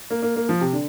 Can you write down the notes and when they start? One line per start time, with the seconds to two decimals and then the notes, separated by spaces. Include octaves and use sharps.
0.10 A#3
0.23 A#3
0.36 A#3
0.49 F3
0.61 C3
0.73 D3